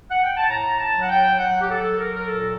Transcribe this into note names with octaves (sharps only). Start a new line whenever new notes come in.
F#5
G5
A5
A2 A#5
A5
F#3
F#5
G5
F#3 F#5
G4
A4
F#3
A#4
A#4
A#2 A4